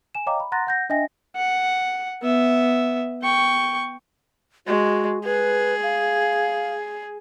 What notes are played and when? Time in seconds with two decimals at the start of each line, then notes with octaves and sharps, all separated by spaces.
0.15 G#5 E7
0.26 C#5 D#5 F5 G5 A#5 D6
0.40 B5
0.52 F#5 A#5 C6 F#6 A6 A#6
0.67 F#5 G6 A#6
0.90 D4 D#5 E5 G5 G#5 A#6
1.36 F#5
2.22 B3 E5
3.22 G5 C#6
4.67 G#3 F#4
5.25 G#4 B4
5.83 F5